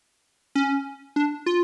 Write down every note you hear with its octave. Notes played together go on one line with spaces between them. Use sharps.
C#4
D4
F4